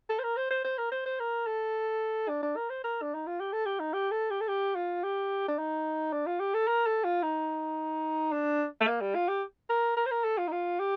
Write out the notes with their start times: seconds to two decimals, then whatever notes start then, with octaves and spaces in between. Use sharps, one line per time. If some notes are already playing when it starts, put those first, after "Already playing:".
0.09 A4
0.19 C5
0.23 A#4
0.37 C5
0.51 C5
0.64 C5
0.77 A#4
0.92 C5
1.05 C5
1.19 A#4
1.47 A4
2.28 D4
2.43 D4
2.56 A#4
2.70 C5
2.84 A#4
3.02 D4
3.14 D#4
3.27 F4
3.40 G4
3.53 A4
3.65 G4
3.80 D#4
3.93 G4
4.11 A4
4.30 G4
4.41 A4
4.48 G4
4.75 F4
5.04 G4
5.48 D4
5.59 D#4
6.13 D4
6.26 F4
6.40 G4
6.54 A4
6.67 A#4
6.86 A4
7.04 F4
7.23 D#4
8.32 D4
8.81 A3
8.87 A#3
9.01 G3
9.15 F4
9.28 G4
9.69 A#4
9.96 A#4
10.06 C5
10.11 A#4
10.24 A4
10.38 F4
10.47 D#4
10.52 F4
10.79 G4